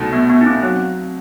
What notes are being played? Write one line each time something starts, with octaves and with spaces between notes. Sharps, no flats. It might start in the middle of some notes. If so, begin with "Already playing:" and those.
Already playing: C2 B2 A3 D#4
B3
B3
D#4
C4
F#3 C4